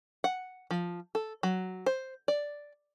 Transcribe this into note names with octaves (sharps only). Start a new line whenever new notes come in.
F#5
F3
A4
F#3
C5
D5